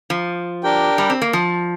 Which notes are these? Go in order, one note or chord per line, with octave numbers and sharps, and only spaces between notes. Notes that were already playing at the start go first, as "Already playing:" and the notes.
F3
D4 G4 A#4 G5
G3
C4
A#3
F3